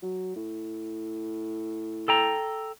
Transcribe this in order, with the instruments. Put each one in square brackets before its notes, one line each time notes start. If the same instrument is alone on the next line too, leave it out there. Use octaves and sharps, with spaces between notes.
[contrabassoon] F#3
A2
[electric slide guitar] A4 G5 A#5